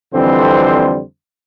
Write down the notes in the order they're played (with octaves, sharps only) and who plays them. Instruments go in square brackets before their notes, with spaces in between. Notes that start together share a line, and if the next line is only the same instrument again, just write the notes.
[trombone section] F2 D3 E3 G3 C4 C5